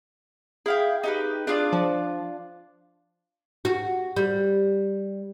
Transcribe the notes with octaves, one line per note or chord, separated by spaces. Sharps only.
E4 G#4 F5 G5
D#4 G4 B4
D4 F4 G#4 D5
F3
F#4
G3